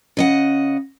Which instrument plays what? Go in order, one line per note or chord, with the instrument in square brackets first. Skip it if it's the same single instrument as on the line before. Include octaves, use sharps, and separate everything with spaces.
[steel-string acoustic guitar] C#3 D#5 F#5